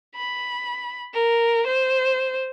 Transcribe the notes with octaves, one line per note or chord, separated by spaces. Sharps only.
B5
A#4
C5